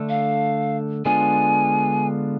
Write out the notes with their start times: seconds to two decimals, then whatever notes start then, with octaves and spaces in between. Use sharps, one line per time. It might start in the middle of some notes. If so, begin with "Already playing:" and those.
Already playing: D3 A3 D4 A4
0.09 F5
1.05 D3 G#3 B3 D4 F4 G#5